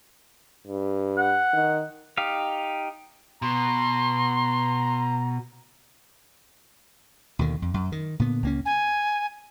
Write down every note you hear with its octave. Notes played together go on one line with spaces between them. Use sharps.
G2
F#5
D#3
D#4 G4 F5
B2 A#5 C6
D#2 B2 D3 D#3
F2
F#2
D#3
A#2 D3 B3
C#2 A#3 C#4
G#5